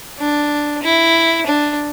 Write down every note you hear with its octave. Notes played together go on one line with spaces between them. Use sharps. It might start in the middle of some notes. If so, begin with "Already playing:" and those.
D4
E4
D4